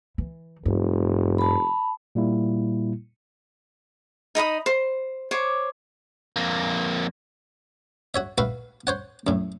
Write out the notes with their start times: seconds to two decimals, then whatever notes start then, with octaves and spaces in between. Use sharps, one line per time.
0.18 E3
0.66 F1 G2
1.38 A5 B5
2.15 A#2 G3 A#3 E4
4.35 D#4 D#5 B5 D#6
4.66 C5
5.31 C5 C#5 D6
6.36 F2 A#3
8.14 F#4 C#5 E5
8.38 F#4 B4 E5 F5
8.87 C5 C#5 F#5
9.27 F#2 A2